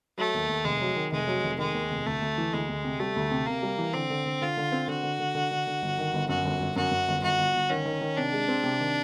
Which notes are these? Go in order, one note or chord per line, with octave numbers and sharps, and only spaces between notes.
F#3 A3
D#2
D#2
F1 G#3
F#3
D#3
F1 G#3
F#3
F1
D#3 G#3
D#2
F1
D2 A3
D2
E3
D2 G#3
D2
C3
G3 A3
D2
C3
C3 A#3
G3
E3
D3 C4
D3
D3
D3 F4
D3
C4
D3 F#4
D3
D3
D3
D3
D3
G1
D#3
G1
F#2 F#4
G1
G1
F#2 F#4
F#2
G1
G1 F#4
G1
G1
D#3 C#4
D#3
D#3
C3 D4
G#3
C4
C3
D#3